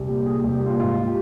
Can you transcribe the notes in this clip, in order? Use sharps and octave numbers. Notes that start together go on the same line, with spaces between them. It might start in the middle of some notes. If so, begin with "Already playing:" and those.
Already playing: C2
A#2 G4
A#2 G#4
G4
C2
G4
A#2 F4
G#2 F4
G4